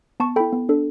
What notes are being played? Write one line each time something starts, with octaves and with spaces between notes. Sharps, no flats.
B3 A5 C#6
E4 A4 G5 B5
B3
D4 A4